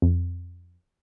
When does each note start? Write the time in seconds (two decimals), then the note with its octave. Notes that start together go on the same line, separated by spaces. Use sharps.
0.02 F2